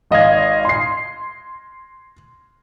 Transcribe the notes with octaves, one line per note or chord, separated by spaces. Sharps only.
G#1 D#5 F5 G#6
C6 C7